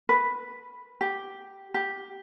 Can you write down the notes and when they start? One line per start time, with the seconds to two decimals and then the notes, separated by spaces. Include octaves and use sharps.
0.09 B4
1.01 G4
1.74 G4